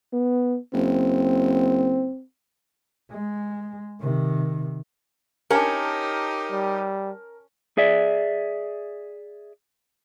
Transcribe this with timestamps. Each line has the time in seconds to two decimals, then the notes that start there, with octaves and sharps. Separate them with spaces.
0.13 B3
0.73 F#1 C4
3.11 G#3
4.00 C3 D#3
5.51 C#4 D#4 G4 A#4 A5
6.52 G3
7.77 G#4 D5 E5